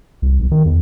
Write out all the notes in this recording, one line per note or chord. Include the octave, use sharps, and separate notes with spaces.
C2
B1
D#3
E2